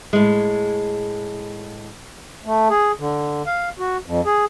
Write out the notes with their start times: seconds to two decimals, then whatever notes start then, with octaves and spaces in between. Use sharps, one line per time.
0.13 A2 G#3
2.45 A3
2.70 G#4
3.00 D3
3.46 F5
3.79 F#4
4.06 F2
4.26 G#4